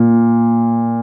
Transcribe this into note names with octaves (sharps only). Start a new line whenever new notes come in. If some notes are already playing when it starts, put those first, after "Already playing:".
Already playing: A#2